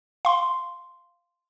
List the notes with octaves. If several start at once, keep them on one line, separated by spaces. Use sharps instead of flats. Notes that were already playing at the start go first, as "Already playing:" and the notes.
F5 C6